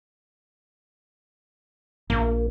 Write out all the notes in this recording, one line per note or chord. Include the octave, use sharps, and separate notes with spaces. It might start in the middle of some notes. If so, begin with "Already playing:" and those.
A#1 A#3